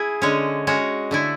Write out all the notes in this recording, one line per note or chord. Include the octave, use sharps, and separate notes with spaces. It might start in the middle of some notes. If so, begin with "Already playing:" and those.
Already playing: E4 G#4
D3 G#3 C#4
G#3 C#4 F#4
D3 A3 E4